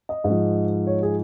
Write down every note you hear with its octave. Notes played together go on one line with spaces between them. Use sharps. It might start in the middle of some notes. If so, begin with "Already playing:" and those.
D#5
G#2
F3
C#5
G#4